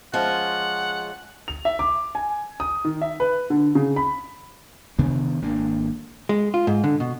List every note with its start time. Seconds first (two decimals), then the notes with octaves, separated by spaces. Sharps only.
0.14 F3 G#3 C#4 F#5
1.48 F7
1.65 E5
1.79 D6
2.15 G#5
2.60 D#6
2.85 D#3
3.02 E5
3.20 B4
3.50 D3
3.75 C#3
3.96 B5
4.99 C3 D#3 B3 D4
5.42 G#1 A#3 D4
6.29 G#3
6.54 F4
6.67 G#2
6.84 D3
7.00 B2